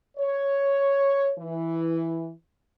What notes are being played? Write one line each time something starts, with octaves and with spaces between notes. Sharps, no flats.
C#5
E3